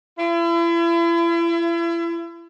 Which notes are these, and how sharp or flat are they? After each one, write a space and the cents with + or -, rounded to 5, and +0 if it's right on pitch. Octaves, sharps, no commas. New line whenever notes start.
E4 +40